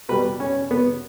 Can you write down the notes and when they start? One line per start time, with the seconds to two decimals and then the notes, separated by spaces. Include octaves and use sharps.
0.09 B2 G3 B4
0.40 C#4
0.71 B3